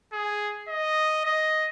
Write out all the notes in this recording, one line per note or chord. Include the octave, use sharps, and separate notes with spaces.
G#4
D#5
D#5